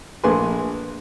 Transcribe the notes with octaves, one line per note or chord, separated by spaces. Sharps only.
A#1 A3 B4 G#5 C6